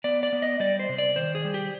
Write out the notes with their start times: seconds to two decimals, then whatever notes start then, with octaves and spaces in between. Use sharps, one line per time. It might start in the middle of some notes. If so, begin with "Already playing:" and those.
0.04 B3 D5
0.23 D5
0.33 B3
0.42 D#5
0.60 G3 D5
0.79 C5
0.89 C3
0.98 D5
1.16 D#3 C5
1.35 G#4
1.44 G3
1.54 G4